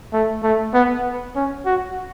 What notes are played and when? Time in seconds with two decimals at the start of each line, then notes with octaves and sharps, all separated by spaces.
0.13 A3
0.43 A3
0.74 B3
1.36 C#4
1.66 F#4